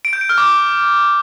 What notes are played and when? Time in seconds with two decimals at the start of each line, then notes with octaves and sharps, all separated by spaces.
0.05 D7
0.13 G6
0.21 D7
0.29 F6
0.38 D6